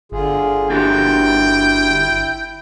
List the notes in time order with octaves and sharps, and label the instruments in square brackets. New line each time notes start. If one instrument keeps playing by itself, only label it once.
[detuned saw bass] G1 [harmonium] D3 F4 G#4
[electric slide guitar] D4 F#4 G4 [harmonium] E4 [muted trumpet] G5